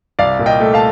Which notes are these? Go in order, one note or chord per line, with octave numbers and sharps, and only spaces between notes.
C2 D5 F5
A#2
D#5 G5
A3
F5 A5